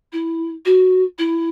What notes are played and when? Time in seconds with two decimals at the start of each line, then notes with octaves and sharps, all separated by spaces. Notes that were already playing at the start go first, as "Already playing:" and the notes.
0.12 E4
0.65 F#4
1.18 E4